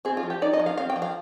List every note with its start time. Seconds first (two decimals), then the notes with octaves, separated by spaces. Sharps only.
0.05 C4 G#4
0.17 F4
0.23 F3
0.30 G4
0.42 D#4 D5
0.53 D#5
0.60 F3
0.66 F5
0.77 C4 F5
0.90 G5
0.96 F3
1.02 F5